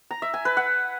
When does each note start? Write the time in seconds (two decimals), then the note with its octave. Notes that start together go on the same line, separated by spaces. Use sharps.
0.11 A#5
0.22 E5
0.34 G#5
0.45 B4
0.57 F#5